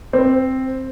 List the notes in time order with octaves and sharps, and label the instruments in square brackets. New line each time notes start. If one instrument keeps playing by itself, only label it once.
[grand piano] C4